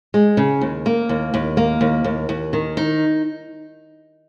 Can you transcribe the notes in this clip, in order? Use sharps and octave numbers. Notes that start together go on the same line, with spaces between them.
G#3
C#3
D#2
A#3
D#2
D#2
A#3
D#2
D#2
D#2
D#3
D#4